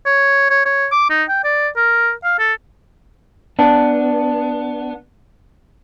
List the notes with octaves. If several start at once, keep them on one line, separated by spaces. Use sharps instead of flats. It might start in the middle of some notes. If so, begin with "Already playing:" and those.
C#5
C#5
C#5
D6
D#4
G5
D5
A#4
F5
A4
B3 D4